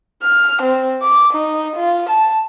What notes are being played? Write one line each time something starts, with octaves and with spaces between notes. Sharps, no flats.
F6
C4
D6
D#4
F4
A5